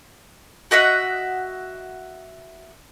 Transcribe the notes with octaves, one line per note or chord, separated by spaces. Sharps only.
F#4 D#5 E5 F#5